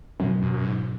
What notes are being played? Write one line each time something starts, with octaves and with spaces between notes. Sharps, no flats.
F#2 B2 F#3 C#4
F#2
F#2
G#2